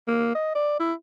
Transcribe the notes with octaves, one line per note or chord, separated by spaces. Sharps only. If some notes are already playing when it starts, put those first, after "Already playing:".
A#3
D#5
D5
E4